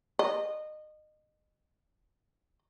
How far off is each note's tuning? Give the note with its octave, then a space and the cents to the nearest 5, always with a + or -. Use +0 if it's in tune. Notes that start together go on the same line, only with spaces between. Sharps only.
D#5 -25